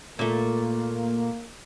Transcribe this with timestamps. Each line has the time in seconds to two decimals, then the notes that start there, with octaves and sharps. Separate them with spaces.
0.19 A#2 A3 A#3